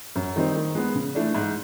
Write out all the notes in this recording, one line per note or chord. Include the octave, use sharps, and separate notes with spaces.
F#2
D#3 G3 C4 D#4
D#3
G#3 B3
C#3
E3 A3 D4
G#2